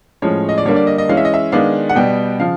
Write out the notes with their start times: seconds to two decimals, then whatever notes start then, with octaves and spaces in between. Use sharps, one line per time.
0.22 A2 F3 G#3 C#4 C#5
0.49 D#5
0.58 D5
0.65 D3 G3 A#3 D4 C#5
0.76 D5
0.87 D#5
0.98 D#5
1.09 E3 G#3 C#4 F5
1.17 E5
1.25 D#5
1.34 E5
1.52 D#3 G#3 B3 D4 F5
1.90 F#5
1.95 B2 G3 B3 G5
2.39 C#3 F3 F5